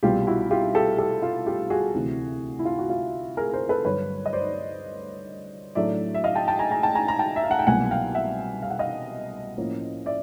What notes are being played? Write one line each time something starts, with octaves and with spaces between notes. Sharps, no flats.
C2 B2 G3 B3 F4 G4
E4 F#4
F4 G4
G4 A4
G4 A4
F4
F4 G4
F#4 G#4
D2 C3 E3
E4
F4
F#4
F4
G#4 A#4
A#4 C5
A4 B4
G2 D3 F#3 B4 C#5
D#5
C5 D5
A2 F#3 A3 D4 D5 E5
E5
D#5 F5
G5 A5
G5 A5
G#5 A#5
G#5 A#5
G5 A5
G#5 A#5
A#5
G5 A5
E5
F5
F#5
G5
C2 B2 F#3 A#3 F#5 G#5
F5 G5
E5 F#5
F5
F#5
D#5 F5
A2 F3 A#3 C#4
D5 E5